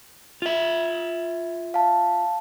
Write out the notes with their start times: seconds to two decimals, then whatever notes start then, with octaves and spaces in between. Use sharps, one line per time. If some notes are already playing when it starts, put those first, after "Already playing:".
0.42 F4 E5
1.74 F5 A5